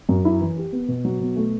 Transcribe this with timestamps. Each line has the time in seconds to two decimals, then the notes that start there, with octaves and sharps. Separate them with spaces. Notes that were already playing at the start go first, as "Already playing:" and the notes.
0.09 F#2
0.25 E4
0.40 E3
0.57 G4
0.72 B3
0.88 B2
1.05 F#3
1.20 B2
1.36 A3